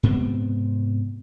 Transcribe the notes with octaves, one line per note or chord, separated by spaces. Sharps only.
G#2 C3 B3 C4